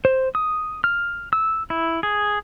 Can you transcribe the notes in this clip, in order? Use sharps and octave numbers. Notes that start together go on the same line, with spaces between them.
C5
D#6
F6
E6
E4
G#4